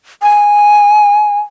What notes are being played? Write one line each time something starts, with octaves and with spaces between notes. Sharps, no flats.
G#5